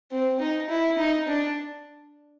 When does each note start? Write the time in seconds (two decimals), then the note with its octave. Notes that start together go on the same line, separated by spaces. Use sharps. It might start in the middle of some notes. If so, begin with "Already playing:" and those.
0.11 C4
0.40 D#4
0.69 E4
0.98 D#4
1.28 D4